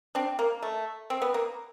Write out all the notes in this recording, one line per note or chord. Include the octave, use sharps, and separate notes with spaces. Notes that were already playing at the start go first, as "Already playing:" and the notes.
C4 D4
A#3
A3
C4
B3
A#3